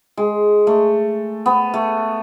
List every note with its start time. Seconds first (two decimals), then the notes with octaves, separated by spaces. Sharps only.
0.17 G#3
0.67 A3
1.46 B3
1.74 A3